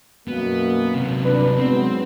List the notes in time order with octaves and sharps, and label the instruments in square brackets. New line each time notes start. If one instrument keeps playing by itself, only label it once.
[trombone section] F#2 B2 A#3 [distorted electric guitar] B3
[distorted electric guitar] C3 F#3
[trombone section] C2 D4 B4
[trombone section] G#2 F#3 B3 [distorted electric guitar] C4